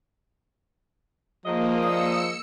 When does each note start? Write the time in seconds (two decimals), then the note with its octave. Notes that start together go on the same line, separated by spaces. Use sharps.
1.46 D#3 F3 G#3 A#3 D#5
1.83 D5 F5 D#6 E6 C#7